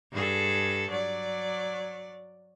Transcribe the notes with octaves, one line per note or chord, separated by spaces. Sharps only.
G2 G#4 A4
F#3 D5